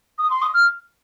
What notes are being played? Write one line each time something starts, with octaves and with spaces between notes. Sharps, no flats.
D#6
C6
D#6
F6